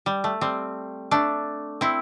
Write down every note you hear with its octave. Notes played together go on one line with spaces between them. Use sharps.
G3
A3
G3 C4
A3 D4
C4 E4